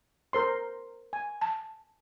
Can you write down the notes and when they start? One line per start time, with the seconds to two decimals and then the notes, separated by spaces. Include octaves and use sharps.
0.33 A#4 C5 C6
1.13 G#5
1.41 A5